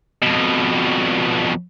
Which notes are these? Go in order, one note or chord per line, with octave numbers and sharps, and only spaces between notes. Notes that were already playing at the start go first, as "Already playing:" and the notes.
F2 B2